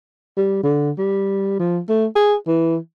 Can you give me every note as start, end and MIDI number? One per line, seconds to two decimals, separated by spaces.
0.37 0.60 55
0.63 0.91 50
0.98 1.56 55
1.59 1.79 53
1.89 2.06 57
2.15 2.34 68
2.47 2.76 52